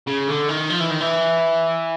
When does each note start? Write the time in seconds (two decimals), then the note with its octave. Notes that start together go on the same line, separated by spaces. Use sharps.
0.07 C#3
0.28 D3
0.48 D#3
0.70 F3
0.80 E3
0.90 D#3
1.00 E3